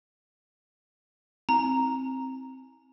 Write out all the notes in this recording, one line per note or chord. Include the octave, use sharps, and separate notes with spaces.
C4 A#5